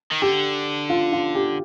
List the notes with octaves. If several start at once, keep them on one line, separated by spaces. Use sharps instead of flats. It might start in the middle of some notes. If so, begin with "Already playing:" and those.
D#3
D3 G4
F4
F4
G4